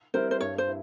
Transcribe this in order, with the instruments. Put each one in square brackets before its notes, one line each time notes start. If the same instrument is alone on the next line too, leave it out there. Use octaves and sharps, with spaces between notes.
[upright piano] G3 C4 E4 A#4 [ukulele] C5
[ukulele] C5
[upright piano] G2 [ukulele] C#5
[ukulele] C5
[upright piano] E4